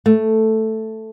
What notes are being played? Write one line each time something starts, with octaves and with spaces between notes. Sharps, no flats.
A3